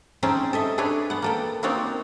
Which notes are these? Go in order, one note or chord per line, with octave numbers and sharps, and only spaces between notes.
C4 C#4 D#4 G#4 G5 A5
A4 D#5 E5
D4 G#4 A4 B4 C#5
B3 F#5
A#3 A4 G5
A#3 C4 D#4 F#4 C#5 D5